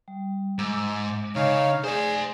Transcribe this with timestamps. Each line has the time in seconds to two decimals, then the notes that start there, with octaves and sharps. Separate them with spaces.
0.08 G3
0.59 G#2 A#5 D6 E6
0.90 G#3 D6
1.36 C#3 D#4 C#5 F5
1.84 G#4 C5 D5 G#5